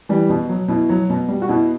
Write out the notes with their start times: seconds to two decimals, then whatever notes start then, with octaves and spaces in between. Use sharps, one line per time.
0.09 E3 G3
0.29 B2
0.49 F#3
0.68 B2 E4
0.89 F#3
1.09 B2
1.28 G3
1.42 F#4
1.48 B2 E4